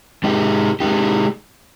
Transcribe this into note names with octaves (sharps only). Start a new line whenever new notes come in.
G#3 D#4 G4
G#3 D#4 G4